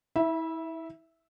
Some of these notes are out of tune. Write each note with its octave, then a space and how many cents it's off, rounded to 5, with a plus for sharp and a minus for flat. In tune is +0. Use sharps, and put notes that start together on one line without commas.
E4 -30 E5 +0